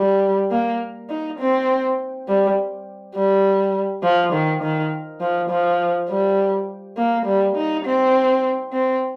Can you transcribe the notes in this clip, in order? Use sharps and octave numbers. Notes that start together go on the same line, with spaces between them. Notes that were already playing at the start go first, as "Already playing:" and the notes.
Already playing: G3
A#3
D#4
C4
G3
G3
F3
D#3
D#3
F3
F3
G3
A#3
G3
D#4
C4
C4